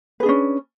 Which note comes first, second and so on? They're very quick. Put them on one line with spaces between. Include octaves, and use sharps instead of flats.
B4 G#4 D4 C#4